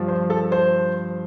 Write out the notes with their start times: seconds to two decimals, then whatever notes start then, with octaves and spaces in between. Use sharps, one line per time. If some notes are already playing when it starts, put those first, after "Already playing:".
Already playing: G2 F3
0.08 C5
0.30 A4
0.52 C5